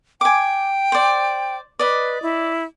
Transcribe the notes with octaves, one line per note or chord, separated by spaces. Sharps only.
G5 G#5 D6
C5 D5
B4 D5 D#5
E4